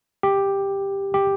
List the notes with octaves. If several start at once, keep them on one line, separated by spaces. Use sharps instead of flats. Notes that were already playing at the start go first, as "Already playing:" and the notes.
G4
G4